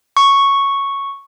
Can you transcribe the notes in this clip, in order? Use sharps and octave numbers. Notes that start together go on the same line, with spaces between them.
C#6